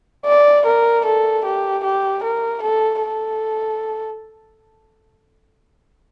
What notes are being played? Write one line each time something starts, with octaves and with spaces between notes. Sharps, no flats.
D5
A#4
A4
G4
G4
A#4
A4
A4